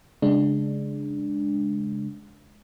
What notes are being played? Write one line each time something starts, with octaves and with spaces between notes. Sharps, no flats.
C#3 G#3 D4